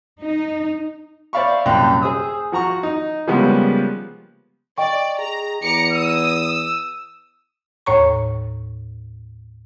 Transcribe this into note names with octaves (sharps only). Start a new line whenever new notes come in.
D#4
C5 D5 E5 F5 B5 C#6
C2 F#2 A#2 G5 C6 F#6
G#4 C5 D#6 E6
F3 F#4 A#5 C#6
D#4
C#3 F3 G3 G#3 A#3 B3
D5 D#5 G5 C#6
G#4 A#5
E2 A#5 D6 C#7
D#6 E6
D#2 A2 C#5 A#5 C#6